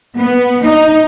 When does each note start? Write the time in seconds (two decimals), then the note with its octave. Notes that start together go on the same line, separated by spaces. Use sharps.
0.18 B3
0.64 D#4